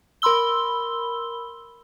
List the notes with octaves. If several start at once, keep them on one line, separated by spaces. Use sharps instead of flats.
A#4 B5 C6 E6 G7